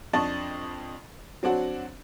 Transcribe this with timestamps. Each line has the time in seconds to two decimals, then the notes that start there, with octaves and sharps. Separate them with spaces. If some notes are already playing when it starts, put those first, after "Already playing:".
0.13 F2 D4 D#5 A5 C#6 A6
1.43 F#3 C4 D4 F#4